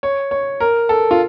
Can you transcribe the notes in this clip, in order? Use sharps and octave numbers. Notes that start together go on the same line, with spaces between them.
C#5
C#5
A#4
A4
F4